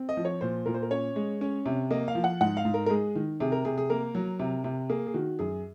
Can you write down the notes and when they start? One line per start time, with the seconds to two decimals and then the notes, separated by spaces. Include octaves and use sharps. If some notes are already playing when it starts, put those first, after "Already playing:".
Already playing: C4
0.09 D#5
0.17 F3
0.25 C#5
0.41 A#2 C5
0.66 A#2 A#4
0.74 C5
0.82 A#4
0.91 C#4 C#5
1.16 G#3
1.41 C#4
1.66 C3
1.91 A#3 D#5
2.08 F5
2.15 F3
2.24 F#5
2.41 G#2 F#5
2.57 F5
2.65 G#2
2.74 A#4
2.86 A#4
2.90 G#3 G#4
3.15 D#3
3.40 C3 G#4
3.52 A#4
3.65 C3 G#4
3.78 G#4
3.90 A#3 A#4
4.15 F#3
4.40 C3
4.64 C3
4.90 A#3 G#4
5.07 G#4
5.14 D#3 F#4
5.39 F#2 G#4